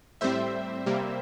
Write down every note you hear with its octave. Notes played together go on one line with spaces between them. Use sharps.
A2 G3 C4 C5 E5
C3 G3 A#3